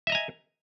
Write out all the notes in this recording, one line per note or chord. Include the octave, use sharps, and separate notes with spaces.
D#5 E5 G#5 A#5